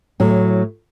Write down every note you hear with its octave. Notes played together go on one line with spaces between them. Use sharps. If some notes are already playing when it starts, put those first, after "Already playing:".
A2 F#3